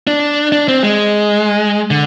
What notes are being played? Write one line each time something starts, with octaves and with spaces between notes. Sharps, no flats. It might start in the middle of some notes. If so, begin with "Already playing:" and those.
D4
D4
C4
G#3
D3